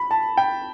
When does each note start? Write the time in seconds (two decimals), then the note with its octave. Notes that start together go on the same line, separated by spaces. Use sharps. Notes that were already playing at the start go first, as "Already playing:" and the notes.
Already playing: B5
0.11 A5
0.37 G5